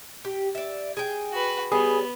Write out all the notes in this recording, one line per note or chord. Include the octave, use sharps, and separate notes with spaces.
G4
D5 E5
G#4 G5
F#4 B4
G3 B3 G#4 C#5